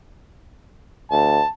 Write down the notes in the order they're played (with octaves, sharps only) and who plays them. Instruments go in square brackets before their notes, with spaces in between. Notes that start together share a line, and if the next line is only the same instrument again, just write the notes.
[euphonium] D2 [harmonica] A5